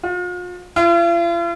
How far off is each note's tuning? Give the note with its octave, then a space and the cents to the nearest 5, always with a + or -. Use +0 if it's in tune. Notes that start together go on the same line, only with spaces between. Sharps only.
F4 +40
F4 -45